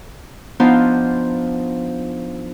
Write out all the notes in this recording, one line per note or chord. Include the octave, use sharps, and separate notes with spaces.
F3 B3 D4 D#4 F4 C5